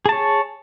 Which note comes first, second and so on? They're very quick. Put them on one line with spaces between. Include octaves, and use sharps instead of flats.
G#4 A5 C#5